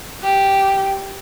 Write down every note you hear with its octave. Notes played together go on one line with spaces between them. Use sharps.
G4